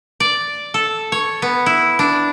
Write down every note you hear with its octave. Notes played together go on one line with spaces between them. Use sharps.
D5
A4
C#5
B3
E4
D4